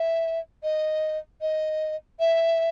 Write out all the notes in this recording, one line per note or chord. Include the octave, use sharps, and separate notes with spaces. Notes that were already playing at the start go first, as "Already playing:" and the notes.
Already playing: E5
D#5
D#5
E5